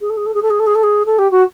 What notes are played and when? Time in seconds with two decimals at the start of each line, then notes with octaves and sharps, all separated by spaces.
0.01 G#4
0.10 A4
0.17 G#4
0.26 A4
0.34 G#4
0.42 A4
0.50 G#4
0.59 A4
0.66 G#4
0.75 A4
0.83 G#4
1.06 A4
1.18 G4
1.31 F#4